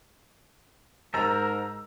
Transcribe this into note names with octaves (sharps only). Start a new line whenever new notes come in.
G#2 A#4 C5 D#5 A5 A#5 E6